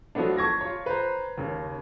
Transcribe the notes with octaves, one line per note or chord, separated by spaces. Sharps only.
F3 F#3 A3 B3 D4
A5 C#6 G#6 A#6
F4 C#5
B4 C5 A#5
D#2 C#3